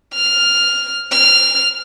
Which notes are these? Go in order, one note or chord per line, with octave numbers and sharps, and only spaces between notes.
F6
F6